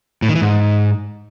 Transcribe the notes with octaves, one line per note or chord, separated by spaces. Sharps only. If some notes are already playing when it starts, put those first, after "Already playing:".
A2
D#3
E3
G#2